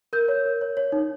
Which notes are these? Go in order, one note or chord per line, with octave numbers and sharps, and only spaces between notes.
A#4 G6
C#5
A#4
C#5
C#5
D#4